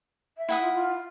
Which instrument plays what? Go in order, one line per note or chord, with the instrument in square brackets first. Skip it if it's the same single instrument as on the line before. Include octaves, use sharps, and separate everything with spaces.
[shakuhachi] E5
[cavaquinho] E4 F#5 D#6
[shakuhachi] F4
F4